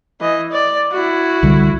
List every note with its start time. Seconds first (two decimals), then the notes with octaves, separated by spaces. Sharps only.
0.21 E3 D#5
0.52 D5
0.92 E4 F#4
1.43 C2 D3 G3